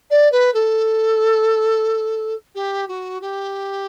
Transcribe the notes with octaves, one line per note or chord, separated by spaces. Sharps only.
D5
B4
A4
G4
F#4
G4